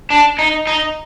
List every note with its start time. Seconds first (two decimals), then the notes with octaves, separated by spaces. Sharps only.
0.10 D4
0.39 D#4
0.67 D#4